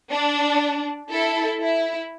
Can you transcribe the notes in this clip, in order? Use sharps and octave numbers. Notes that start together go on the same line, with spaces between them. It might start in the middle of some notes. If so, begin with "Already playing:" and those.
D4
E4 A4
E4